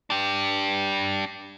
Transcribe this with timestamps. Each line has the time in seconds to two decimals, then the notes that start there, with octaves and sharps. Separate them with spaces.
0.10 D4 G4